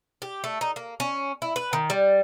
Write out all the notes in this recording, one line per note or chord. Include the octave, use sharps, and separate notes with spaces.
G4
A3
D#4
A#3
C#4
E4
B4
D#3
G3